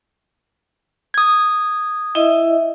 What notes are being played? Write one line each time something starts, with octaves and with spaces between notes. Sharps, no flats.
D#6 G#6
E4 D#5 E5